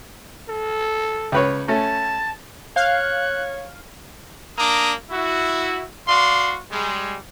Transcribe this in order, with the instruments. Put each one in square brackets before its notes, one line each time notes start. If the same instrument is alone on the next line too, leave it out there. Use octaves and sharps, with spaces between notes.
[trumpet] A4
[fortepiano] C#2 B4 C#5
[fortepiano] A3 C#4 [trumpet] A5
[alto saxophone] C#5 [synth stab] F5 [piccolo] F#6
[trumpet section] A#3 D4 A#5 D6 D#6
E4 F#4
F#4 D5 F5 C6
G3 G#3